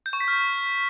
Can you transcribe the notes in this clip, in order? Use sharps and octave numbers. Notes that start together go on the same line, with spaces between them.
G6
C#6
B6
F6